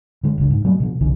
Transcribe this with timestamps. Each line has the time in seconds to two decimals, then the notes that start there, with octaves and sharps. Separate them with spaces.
0.23 D3 G#3
0.38 F#1 C#2 D3
0.50 G#2
0.65 F#3 G3 A3 A#3
0.80 B2 F3
1.00 F#1 C2 D3 E3